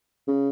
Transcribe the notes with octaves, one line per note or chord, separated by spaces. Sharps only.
C#3